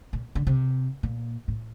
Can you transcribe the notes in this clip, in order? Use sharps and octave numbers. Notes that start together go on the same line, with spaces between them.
A#2
D3
C3
A#2
A2